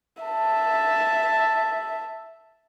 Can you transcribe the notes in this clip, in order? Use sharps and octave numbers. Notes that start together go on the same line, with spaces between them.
E5 A5